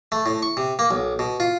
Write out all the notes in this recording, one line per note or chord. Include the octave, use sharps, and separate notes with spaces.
A3
A2
C#6
C3
A#3
B1
B2
F4